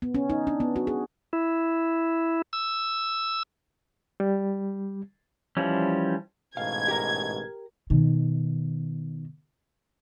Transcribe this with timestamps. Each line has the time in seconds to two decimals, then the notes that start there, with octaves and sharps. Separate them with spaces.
0.02 B3
0.14 C#4
0.30 D#4
0.47 D4
0.60 B3
0.76 F#4
0.87 G#4
1.33 E4
2.53 E6
4.20 G3
5.57 E3 F3 G3 C#4
6.57 A1 G#2 B2 F5 G#6
6.88 G4 A#4 A#5
7.90 B2 D#3